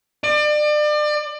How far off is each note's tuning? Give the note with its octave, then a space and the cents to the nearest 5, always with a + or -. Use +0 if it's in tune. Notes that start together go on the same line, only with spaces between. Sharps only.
D5 +35